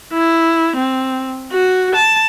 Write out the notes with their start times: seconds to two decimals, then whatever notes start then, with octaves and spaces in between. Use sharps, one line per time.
0.13 E4
0.76 C4
1.53 F#4
1.95 A5